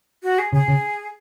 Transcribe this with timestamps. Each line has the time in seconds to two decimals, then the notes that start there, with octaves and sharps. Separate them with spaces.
0.23 F#4
0.38 G#4
0.53 C#3 G#4
0.68 C#3